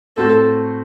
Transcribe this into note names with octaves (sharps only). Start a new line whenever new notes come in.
A2 A3 C4 F#4 A4